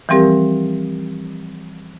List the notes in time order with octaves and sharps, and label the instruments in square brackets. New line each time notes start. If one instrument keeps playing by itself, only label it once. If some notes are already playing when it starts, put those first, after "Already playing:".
[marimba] E3 F3 G3 C4 G4 A#4